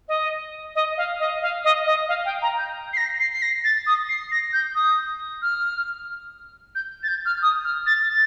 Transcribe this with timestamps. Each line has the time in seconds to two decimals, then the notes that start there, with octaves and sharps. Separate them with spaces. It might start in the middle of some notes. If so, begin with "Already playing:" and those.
0.08 D#5
0.75 D#5
0.97 F5
1.20 D#5
1.42 F5
1.64 D#5
1.86 D#5
2.09 F5
2.25 G5
2.42 A#5
2.59 G6
2.93 C7
2.97 A#6
3.20 C7
3.32 C7
3.42 A#6
3.64 A6
3.87 D#6
4.09 C7
4.31 A#6
4.53 G6
4.75 D#6
5.42 F6
6.75 G6
7.03 A6
7.08 G6
7.26 F6
7.42 D#6
7.64 F6
7.86 A6
8.09 A6